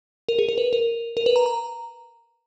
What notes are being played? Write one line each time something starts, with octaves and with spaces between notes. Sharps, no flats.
A#4
G#4
A#4
B4
A#4
A#4
B4
A#5
A#5